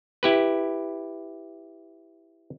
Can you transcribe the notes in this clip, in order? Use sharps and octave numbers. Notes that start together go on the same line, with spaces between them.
E4 G4 B4